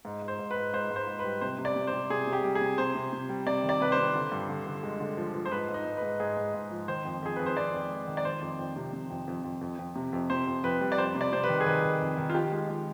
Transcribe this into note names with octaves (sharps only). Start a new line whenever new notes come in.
G#2
G#2
C5
G#2
B4
G#2
G#2 C5
G#2
C5
G#2
B4
G3
C3 C5
C3
D5
C3
C5
C3
C3 G#4
C3
G4
G3
G#4
C3
C3 C5
C3
C3
G3
C3 D5
D#3
D5
C3 B4
C5
C3
D3
G2
D3
D3
G#3
D3
F3
F3
C5
G#2 B4
G#2
D#4
G#2
B4
G#2
G#2 G#4
G#2
G#2
F3
D#3 C5
F2
F2 G#4
F2 B4
C5
F2 D5
F2
G#3
D#3
D5
D#3 C5
F2
F2
C3
C3
F2
F2
F2
F2
F2
C3
F2
C3 C5
F2
F2 B4
G3
D5
F2 C5
C3
D5
C3 C5
B4
D#3
G#4
D#3 B4
D#3
F2
D#3
F4
F3 G4
G#3
G#3